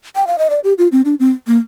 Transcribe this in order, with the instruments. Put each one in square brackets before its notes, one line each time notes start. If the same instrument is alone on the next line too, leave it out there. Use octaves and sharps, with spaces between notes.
[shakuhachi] G5
F5
D#5
D5
G4
F4
C4
D4
C4
A#3